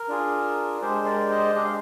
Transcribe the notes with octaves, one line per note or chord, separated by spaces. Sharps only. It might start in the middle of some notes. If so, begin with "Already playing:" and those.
Already playing: A#4
D4 F4 G#4
G#3 D4 G4 G#4 C5
A#4 D5
C5 D#5
G#3 D4 G4 D#5
F5